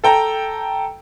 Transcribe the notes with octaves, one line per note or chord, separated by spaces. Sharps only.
A4 G5 A#5